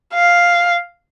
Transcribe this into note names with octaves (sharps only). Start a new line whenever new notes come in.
F5